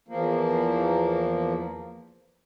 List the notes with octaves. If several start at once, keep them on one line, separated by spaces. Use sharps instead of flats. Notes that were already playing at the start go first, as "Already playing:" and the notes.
E2 F3 A#3